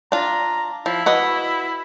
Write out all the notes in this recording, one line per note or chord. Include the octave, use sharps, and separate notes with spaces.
D4 F4 A#5
F3 E4
F#4 B4 D#5